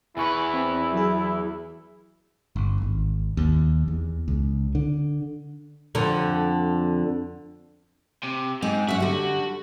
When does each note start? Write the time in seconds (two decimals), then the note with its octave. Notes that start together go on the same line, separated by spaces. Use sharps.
0.17 E2 E4 B4 G#5 C#6
0.54 C4
0.93 F#3 G#4
2.56 G1
2.82 G#1
3.37 D#2
3.88 E2
4.28 C#2
4.75 D3
5.95 F2 D3
8.23 C3
8.62 G#2 C4 D#4
8.88 F#2 F#4 E5
9.00 D3 G3